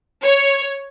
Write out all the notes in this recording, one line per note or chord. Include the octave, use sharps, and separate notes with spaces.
C#5